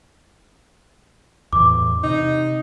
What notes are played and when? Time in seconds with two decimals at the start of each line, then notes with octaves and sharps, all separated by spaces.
1.53 E2 A2 E3 D6
2.04 C3 D#4